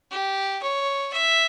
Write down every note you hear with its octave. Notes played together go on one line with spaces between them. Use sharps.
G4
C#5
E5